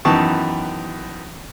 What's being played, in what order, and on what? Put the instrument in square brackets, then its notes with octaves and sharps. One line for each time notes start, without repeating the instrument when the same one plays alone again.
[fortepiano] F#2 D#3 E3 B3 A5 C#6